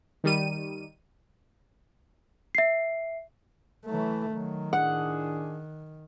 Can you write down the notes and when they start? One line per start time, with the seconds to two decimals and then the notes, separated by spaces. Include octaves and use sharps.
0.24 D#3 G3 D#7
2.55 E5 C7
3.86 E3 F#3 A3
4.33 D#3 F#3
4.73 A2 D4 G#4 F#5